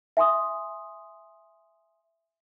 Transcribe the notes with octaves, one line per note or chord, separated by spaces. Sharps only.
E5 G#5 C6 D#6